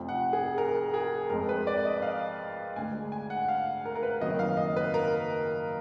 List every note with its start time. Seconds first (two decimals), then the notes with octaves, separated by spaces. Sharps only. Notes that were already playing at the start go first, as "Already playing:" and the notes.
Already playing: F1 F2 F3
0.09 F#5
0.33 G#4
0.58 A#4
0.94 G#4
1.30 F2 F3 G#3 A#4
1.49 B4
1.67 D5
1.85 D#5
1.97 D#5
2.02 F5
2.76 D2 D3 G#3 G#5
3.12 G#5
3.30 F#5
3.48 F5
3.85 A#4
3.95 A#4
4.03 B4
4.21 F#1 F2 D#3 F#3 D#5
4.39 F5
4.57 D#5
4.76 B4
4.94 A#4